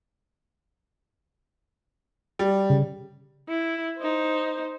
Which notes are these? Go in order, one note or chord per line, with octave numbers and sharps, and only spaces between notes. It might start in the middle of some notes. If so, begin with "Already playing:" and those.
G3
C#3
E4
D#4 C5